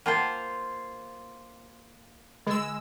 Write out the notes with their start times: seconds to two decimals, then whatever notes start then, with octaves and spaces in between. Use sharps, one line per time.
0.06 A#3 F4 C5 F#5 G5 A5
2.47 D3 G#3 E6